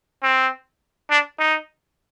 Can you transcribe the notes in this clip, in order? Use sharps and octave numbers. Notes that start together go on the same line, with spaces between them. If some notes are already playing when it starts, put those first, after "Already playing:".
C4
D4
D#4